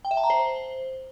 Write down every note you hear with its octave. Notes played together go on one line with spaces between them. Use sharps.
G5
E5
A5
A#5
C5